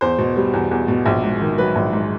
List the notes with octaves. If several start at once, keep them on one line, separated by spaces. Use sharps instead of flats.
E2 C5
B2
G3
E2
E2
B2
A#1
G#2
D#3
F#3 B4
A#1
G#2